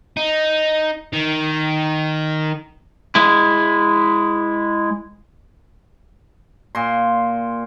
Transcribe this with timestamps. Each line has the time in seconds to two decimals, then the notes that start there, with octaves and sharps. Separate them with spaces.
0.17 D#4
1.13 D#3
3.15 G#3 E4
6.75 A#2 C6